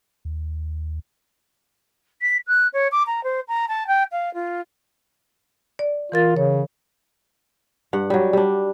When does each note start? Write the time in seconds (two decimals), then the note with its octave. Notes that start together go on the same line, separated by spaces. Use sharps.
0.25 D#2
2.22 B6
2.47 F#6
2.73 C#5
2.91 D6
3.06 A#5
3.23 C5
3.48 A#5
3.68 A5
3.87 G5
4.11 F5
4.34 F4
5.79 D5
6.12 E3 F4 A#4 A6
6.37 C#3 C#5
7.93 G2 F#5
8.10 F#3 G3
8.33 G3 D4